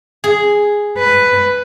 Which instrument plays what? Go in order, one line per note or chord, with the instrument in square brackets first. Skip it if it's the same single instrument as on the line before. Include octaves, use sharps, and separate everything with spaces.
[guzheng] G#4
[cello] B4